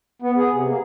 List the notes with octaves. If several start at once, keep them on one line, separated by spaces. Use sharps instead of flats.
B3
G#4
C3
A#3